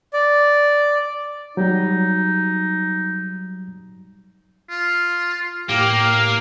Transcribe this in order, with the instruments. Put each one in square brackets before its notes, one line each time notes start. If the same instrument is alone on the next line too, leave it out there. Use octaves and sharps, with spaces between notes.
[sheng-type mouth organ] D5
[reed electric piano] F#3 G3 [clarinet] D#4
[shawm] F4
[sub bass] A2 [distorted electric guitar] A#3 [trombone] G4 [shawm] F5